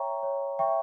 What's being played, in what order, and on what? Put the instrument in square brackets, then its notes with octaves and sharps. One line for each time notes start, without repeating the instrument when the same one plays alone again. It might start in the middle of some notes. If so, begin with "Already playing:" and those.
Already playing: [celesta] C#5 E5 G5 A#5 C#6
C#5
E5 G5 A#5 C#6